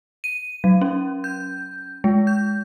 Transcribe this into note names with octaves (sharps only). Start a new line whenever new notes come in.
D#7
F#3
C#4
G6
G#3
G6